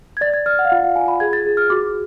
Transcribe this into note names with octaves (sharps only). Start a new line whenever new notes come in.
G#6
D5 A6
G#6
D5 F6
F#5
F5
F4 F#5
F5
F4 G#5
B5
G#4 G#6
A6
G#4
F6
F#4 D6